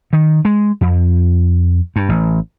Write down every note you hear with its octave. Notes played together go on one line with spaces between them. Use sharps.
D#3
G#3
F2
G2
A1